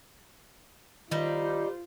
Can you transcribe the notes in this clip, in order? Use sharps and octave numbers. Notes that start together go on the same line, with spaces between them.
D#3 G3 D#4 F4 C5